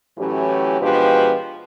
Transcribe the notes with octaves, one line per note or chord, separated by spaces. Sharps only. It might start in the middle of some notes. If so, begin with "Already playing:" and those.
A2 E3 F#3 C#4 G4
B2 F3 G#3 D4 G4 B4